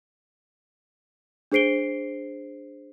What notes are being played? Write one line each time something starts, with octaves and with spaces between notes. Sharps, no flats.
D4 G#4 C5 C7 D7 G7